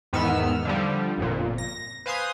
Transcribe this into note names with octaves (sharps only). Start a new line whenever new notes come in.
E2 G#2 D#3 B3 E6 F6
D3 F3 G3
G1 F2 A#2
A#6
B4 C5 F5 G#5 C6 D#6